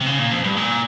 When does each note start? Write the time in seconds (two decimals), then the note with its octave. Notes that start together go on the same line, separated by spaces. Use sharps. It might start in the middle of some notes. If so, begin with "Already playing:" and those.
0.01 C3
0.06 C#3
0.19 A#2
0.31 F2
0.44 G2
0.57 A#2